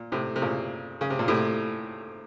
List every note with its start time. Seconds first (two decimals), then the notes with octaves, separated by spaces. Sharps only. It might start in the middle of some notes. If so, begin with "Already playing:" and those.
Already playing: A#2
0.12 A2 C3
0.36 C3
0.42 A#2 C#3
1.01 C#3
1.10 C3
1.19 A#2
1.28 A2 C3